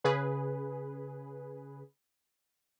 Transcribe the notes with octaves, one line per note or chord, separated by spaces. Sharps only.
C#3 G#4 B4